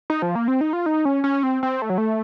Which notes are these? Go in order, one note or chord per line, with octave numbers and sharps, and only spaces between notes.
D#4
F3
A#3
C4
D#4
F4
D#4
C#4
C#4
C4
C4
A3
F#3
A3